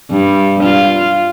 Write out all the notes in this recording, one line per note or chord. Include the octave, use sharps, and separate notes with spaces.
G2
F4